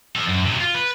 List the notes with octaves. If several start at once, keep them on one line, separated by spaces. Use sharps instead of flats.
F3 A4
F#2
C3 F#3
F4
B4